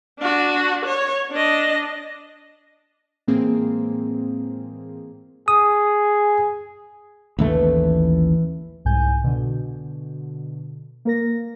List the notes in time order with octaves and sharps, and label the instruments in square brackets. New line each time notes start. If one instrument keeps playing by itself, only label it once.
[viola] D4 F#4
C#5
D4 D#5
[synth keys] A2 E3 G#3 A#3 C4 G#4
[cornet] G#4 [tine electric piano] D#6
[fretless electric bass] A1 D#2 A3 [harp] E3
[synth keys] C2 G#2 G#5 G6
B2 D3
A#3 A#4 A#6